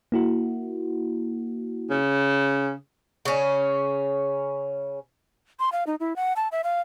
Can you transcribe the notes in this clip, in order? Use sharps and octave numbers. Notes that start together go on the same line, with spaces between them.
A#3 E4 F#4
C#3
C#3 C#4
C6
F5
D#4
E4
F#5
A5
E5
F5